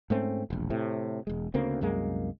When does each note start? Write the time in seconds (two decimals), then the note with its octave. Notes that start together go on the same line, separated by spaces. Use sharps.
0.10 G#2 A3 C4 C#4
0.50 E1 A#1
0.70 A2 C3
1.27 E1 G#3
1.54 D2 C#3 A#3 C4
1.81 C2 F#2 G#3 A#3